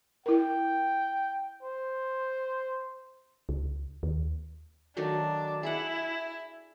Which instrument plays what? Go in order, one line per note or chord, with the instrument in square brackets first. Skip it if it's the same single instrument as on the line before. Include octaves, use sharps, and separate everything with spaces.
[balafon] E4 A#4 [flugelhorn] G5
[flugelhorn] C5
[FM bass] C#2
D#2
[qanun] D#3 F#3 A3 [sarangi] D4
[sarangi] E4 [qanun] G#4 E5 F#5